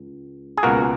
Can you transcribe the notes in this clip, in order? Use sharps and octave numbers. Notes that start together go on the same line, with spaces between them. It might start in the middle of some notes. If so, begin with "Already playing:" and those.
Already playing: C#2
G#4
C#2 B2 A#3 F#4 A#4